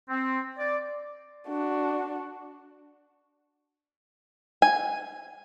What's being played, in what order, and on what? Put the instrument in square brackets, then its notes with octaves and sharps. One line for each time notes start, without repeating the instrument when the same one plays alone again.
[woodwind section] C4
D5
[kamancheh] D4 F#4
[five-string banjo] G#5